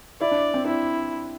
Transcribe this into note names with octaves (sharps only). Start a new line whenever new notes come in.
E4 D5
D4
C4
D4 E4